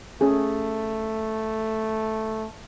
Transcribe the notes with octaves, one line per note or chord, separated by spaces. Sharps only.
A3 C#4 G#4